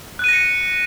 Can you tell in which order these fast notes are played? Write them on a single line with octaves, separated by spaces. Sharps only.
F#6 D#7 A#6 C#7